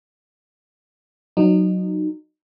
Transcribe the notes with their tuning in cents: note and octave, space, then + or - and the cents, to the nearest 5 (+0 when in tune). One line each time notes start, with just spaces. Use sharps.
F#3 +0 D#4 -25